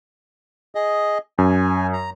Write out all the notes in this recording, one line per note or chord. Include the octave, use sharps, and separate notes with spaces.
G#4 D#5
F#2 G#5
A#5